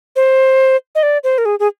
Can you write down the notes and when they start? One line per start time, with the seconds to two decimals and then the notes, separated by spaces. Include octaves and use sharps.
0.16 C5
0.95 D#5
1.03 D5
1.24 C5
1.38 A#4
1.45 G#4
1.60 G#4